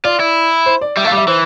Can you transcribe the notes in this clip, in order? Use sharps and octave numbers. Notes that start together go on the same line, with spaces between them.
F4 D5
E4
C5
D5
G3 E5
A3 F5
G3
E5
E3 C5